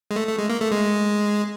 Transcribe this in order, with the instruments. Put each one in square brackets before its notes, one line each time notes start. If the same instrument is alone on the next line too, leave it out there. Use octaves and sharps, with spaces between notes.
[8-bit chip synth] G#3
A3
A3
G#3
A#3
A3
G#3